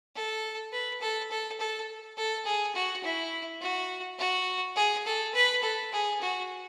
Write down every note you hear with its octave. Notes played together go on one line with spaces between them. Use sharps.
A4
B4
A4
A4
A4
A4
G#4
F#4
E4
F#4
F#4
G#4
A4
B4
A4
G#4
F#4